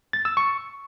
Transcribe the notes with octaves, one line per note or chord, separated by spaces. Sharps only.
A6
E6
C#6